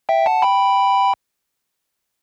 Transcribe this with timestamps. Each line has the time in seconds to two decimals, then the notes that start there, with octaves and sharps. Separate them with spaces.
0.09 E5 G5
0.26 F#5 A5
0.42 G5 B5